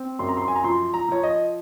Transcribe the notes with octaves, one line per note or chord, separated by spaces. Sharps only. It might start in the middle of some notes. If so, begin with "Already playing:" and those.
Already playing: C4
F#2 C6
A#5
C6
G#5
A#5
F3 C6
A#5
F3 C#5
D#5